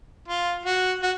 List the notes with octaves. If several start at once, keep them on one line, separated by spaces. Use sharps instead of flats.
F4
F#4
F#4